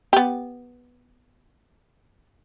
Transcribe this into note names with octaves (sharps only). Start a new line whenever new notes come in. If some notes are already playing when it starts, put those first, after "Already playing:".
B3 G4